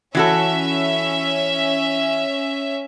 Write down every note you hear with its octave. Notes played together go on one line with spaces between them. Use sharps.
E3 C#4 F#4 A4 E5